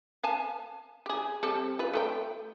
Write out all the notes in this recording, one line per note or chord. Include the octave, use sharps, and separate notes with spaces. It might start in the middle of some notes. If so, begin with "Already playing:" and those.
F5 G#5 A5
G4 G#4
G3 C4 A4
F4 B4
A3 A4 G5